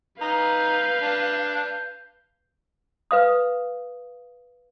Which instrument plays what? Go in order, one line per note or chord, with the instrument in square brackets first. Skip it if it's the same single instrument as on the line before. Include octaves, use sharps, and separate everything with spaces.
[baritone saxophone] D#4 [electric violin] B4 F5 [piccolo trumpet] G6
[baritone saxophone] D4
[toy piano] B4 F5 D#6